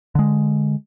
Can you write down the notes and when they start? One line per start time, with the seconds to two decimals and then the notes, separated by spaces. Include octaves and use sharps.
0.15 D3 G#3